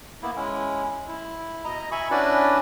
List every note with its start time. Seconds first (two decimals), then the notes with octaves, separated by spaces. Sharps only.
0.23 A#3 B3 E4
0.36 G#3 C#4 E4
1.08 E4
1.65 B2 D#5 A#5
1.92 E5 G#5 B5 C#6
2.11 C#4 D4 E4 F#4 B4 D5